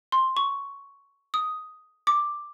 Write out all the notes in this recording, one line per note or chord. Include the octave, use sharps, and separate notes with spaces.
C6
C#6
D#6
D6